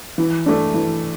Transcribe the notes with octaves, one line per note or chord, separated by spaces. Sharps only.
E3
A3 D4
E3